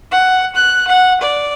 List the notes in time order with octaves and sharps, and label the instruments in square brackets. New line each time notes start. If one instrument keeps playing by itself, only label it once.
[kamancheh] F#5
F#6
F#5
D5